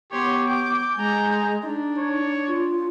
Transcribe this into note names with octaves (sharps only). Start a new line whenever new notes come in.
B3 G4 C#5 C6
D6 G6
G#3 G#5 A#5
D4 D#4
C#5
F4